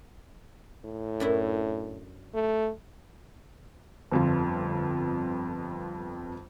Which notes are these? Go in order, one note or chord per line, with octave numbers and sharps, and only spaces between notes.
A2
F#2 D4 E4
A3
G1 F2 F4